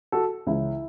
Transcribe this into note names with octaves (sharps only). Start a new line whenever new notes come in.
F#4 A4
C#2 C#3 E3 E4